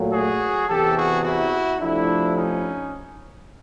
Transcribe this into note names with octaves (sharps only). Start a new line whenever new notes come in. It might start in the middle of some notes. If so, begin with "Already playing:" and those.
Already playing: A#2 F#3 A3
F#4 G#4
E2 C3 E3 G4 A4
F#4 G#4
E4 F#4
F2 C3 F3 A3 D4 E4
C#4 D#4